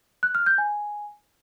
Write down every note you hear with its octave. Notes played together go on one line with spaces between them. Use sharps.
F#6
F6
G6
G#5